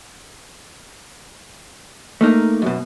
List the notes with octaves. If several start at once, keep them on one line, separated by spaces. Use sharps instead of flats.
A3 A#3 D#4
F#2 B2